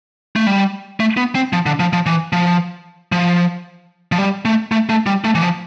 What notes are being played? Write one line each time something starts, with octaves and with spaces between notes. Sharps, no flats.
A3
G3
A3
B3
C4
F3
D3
F3
F3
E3
F3
F3
F3
G3
A3
A3
A3
G3
A3
E3
F3